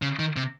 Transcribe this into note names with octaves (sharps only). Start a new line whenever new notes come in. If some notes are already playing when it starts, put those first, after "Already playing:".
C#3
D#3
C3